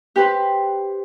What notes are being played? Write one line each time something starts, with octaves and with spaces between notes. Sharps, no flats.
G4 B4 C5